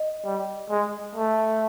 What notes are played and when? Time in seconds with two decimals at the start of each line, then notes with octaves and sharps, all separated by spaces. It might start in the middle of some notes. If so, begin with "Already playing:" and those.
Already playing: D#5
0.25 G3
0.70 G#3
1.15 A3